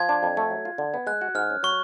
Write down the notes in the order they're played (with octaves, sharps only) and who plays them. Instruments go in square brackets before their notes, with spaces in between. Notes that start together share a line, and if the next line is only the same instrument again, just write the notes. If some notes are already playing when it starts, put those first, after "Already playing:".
Already playing: [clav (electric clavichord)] F3 [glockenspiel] G#6
[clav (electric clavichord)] D4
F2
A3
F#3
F4
D3
B3
[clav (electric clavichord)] G#3 [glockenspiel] F#6
[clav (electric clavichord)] F#4
[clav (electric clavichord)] G#2 [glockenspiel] F6
[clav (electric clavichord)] C#4
[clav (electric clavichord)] F#3 [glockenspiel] C#6